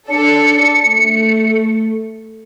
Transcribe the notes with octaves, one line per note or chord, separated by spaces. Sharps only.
D4 A4 C#7
A3